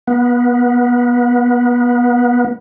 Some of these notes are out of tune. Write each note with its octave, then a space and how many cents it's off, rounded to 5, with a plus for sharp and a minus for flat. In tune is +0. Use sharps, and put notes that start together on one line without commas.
B3 -25